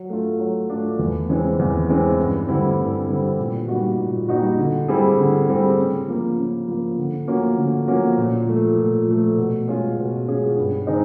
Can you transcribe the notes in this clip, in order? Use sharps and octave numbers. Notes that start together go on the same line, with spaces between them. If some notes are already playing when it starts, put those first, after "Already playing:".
Already playing: F#3
A3 D4 F4
F#3
A3 D4 F4
E2
C#3 E3 G#3 C4
E2
C#3 E3 G#3 C4
G2
D3 G3 C4 E4
G2
D3 G3 C4 E4
A#2
G3 A#3 D#4 F#4
A#2
G3 A#3 D#4 F#4
D3
G3 C4 E4 G#4
D3
G3 C4 E4 G#4
C#3
F3 A#3
C#3
F3 A#3
D3
F3 A#3 C#4 F#4
D3
F3 A#3 C#4 F#4
A#2
F3 A3
A#2
F3 A3
B2
G#3 C#4 F4 G#4
B2
G#3 C#4 F4 G#4
G2
D#3 G#3 C4 D#4